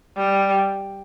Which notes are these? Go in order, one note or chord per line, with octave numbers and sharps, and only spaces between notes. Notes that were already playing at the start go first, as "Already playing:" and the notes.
G3